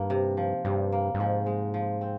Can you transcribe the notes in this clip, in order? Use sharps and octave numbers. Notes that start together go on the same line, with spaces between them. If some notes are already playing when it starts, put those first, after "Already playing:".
Already playing: G2 D#3 A#3
C3
F3
G2 C3
A#3
G2
G#2 F3
G#3
F3
C4